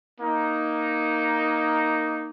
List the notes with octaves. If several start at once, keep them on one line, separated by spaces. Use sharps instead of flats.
A#3 D#4